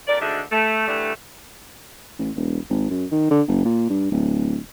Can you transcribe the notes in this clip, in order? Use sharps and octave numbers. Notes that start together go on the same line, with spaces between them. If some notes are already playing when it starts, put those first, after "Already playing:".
F2 A#2 A#4 D5
D2 D3 G#3 D4 D#4 E5
A3
D3 E3 G3 A3
A1
E1
G#1
F#2
D#3
D3
F#1
A#2
G2
D1